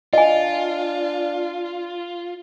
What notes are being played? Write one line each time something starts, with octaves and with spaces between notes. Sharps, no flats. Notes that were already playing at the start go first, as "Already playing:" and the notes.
D4 F4 D#5 G#5